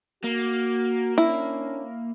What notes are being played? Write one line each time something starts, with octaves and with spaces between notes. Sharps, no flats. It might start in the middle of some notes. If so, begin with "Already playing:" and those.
A#3 F#4
C#4 D4 E4